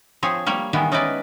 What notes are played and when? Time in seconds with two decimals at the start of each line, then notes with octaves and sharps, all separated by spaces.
0.23 F3 C4 G#4 C#5
0.46 G3 A#3 C#5
0.73 D#3 E3 G3 G#3 B3
0.92 C#4 D#4 E4 B4 D5